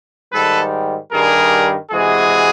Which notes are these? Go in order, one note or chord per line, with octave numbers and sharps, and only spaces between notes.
G#2 D#3 G3 A4 B4
G2 D#3 G3 G#4 A#4
C3 E3 G#3 F#4 G#4